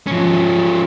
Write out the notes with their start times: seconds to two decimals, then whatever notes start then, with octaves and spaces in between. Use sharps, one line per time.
0.07 F3 C#4